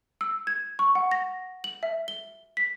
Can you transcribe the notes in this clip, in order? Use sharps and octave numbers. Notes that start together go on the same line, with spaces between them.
E6
G#6
C#6
F#5
A#6
F#7
E5
G7
B6